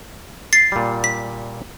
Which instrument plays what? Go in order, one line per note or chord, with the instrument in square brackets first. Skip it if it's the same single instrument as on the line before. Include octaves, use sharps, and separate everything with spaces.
[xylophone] A6 C7
[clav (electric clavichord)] A#2 G3
[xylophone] B6